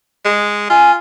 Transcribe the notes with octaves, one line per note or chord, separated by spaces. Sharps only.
G#3
F4 G#5